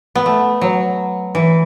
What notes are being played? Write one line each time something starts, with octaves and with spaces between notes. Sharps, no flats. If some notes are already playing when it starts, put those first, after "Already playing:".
B3
A3
F#3
E3